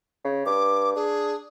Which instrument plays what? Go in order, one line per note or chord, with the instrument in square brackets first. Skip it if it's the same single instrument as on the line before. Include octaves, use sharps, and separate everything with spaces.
[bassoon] C#3
[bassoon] G2 [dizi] D6
[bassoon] D4 [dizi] G#4